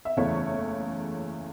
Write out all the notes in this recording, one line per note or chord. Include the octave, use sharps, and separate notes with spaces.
E5
F#1 E2 C#3 A3 E4 C#5